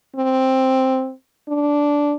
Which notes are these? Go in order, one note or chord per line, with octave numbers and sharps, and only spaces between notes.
C4
D4